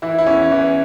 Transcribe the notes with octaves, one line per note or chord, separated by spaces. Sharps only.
E3 E4
E4
E2 C#4
E3